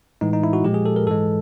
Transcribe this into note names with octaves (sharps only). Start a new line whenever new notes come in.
A2 E3 G#3 D#4
D#4
E4
F#4
A#2 F3 G#3 G4
G#4
A4
A#4
G#2 E3 G#3 A4